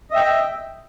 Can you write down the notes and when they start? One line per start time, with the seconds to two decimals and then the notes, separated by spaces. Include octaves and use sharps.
0.11 D#5
0.13 E5
0.16 G5